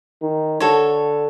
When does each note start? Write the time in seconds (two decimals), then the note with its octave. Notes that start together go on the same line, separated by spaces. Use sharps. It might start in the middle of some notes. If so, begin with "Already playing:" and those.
0.22 D#3
0.60 D3 F#4 A4 C#5